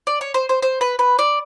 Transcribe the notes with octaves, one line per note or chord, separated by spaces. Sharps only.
D5
C#5
C5
C5
C5
B4
B4
D5